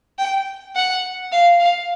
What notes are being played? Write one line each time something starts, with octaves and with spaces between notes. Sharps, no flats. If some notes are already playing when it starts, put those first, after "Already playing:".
G5
F#5
F5
F5